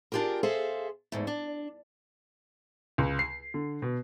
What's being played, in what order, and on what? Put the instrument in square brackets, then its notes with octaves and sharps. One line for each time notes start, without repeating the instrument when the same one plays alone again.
[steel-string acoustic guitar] D4 F4 G4 G#4 A#4
G#4 A4 C5 E5 F5
E2 G#2 A3
D4
[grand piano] C#2
C7
D3
B2